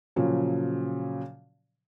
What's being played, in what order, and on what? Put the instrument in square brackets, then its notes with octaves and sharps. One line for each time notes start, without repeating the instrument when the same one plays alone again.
[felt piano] A#2 C#3 F3 F#3